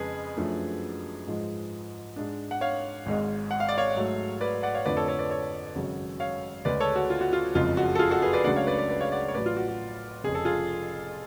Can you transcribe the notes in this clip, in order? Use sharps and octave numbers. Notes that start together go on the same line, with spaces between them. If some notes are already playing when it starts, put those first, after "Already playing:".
Already playing: F2 C#3 G#3 G#4 B4
F#2 F3 A3 D4
G#2 F3 G#3
G#2 G#3 D4
F#5
C#5 F5
G#1 G#2 G#3
F#5
F5
D5
C#5 F5
G#2 F#3 A3
B4 D5
D5 F#5
C#5 F5
F2 D3 F3 A3 B4 D5
A4 C#5
A4 C#5
B4 D5
A4 C#5
G#1 F#2 C#3 F#3
C#5 F5
D2 C#3 G#3 C#4 B4 D5
A4 C#5
F#4
F4
F#4
F4
F#1 F2 C#3 G#3 F4
F#4
A4
F4 G#4
F#4 A4
G#4 B4
B4 D5
C#2 C#3 F#3 A3 D4 D5 F#5
C#5 F5
B4 D5
B4 D5
B4 D5
C#5 F5
D5 F#5
C#5
A1 A2 F#3 B4 D5
F4
F#4
F#4
F1 F2 C#3 G#4
A4
F4 G#4